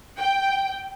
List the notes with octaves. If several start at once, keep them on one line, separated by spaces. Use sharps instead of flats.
G5